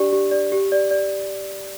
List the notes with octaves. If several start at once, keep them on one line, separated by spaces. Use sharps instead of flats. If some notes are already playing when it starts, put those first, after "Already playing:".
Already playing: D4 G4 D5
G4
D5
G4
D5
D5